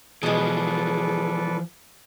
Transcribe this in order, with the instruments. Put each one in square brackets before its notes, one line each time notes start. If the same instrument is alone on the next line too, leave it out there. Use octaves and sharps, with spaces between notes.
[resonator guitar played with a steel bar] B2 G#3 [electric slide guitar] E3 F3 [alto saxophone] G#4 [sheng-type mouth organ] A4 B4 D5